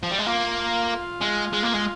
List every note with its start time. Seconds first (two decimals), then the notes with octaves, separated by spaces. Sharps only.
0.03 F3
0.11 G3
0.19 G#3
0.27 A#3 F4
1.21 G#3
1.53 G#3
1.63 A#3
1.73 G#3